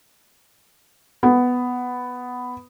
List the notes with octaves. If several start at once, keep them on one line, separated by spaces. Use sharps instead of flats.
B3